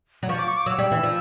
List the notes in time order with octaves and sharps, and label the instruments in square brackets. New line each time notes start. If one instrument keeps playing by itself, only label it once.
[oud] F#3
[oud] F3 [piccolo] C#6
[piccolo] D6
C#6
D6
[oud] F#3 [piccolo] E6
[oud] G3
E3
F3